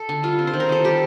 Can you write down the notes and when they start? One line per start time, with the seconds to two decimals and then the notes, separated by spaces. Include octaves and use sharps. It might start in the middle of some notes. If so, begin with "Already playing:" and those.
Already playing: A4
0.09 D3
0.23 G3 F4
0.39 C4
0.47 C5
0.54 D#3
0.60 A#4
0.69 D#3 A4
0.84 G3 G4